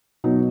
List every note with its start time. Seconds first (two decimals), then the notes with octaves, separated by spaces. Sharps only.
0.24 B2 F#3 D#4